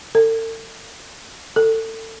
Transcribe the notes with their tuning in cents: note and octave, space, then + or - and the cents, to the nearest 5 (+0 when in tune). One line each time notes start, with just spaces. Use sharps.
A4 +40
A4 +25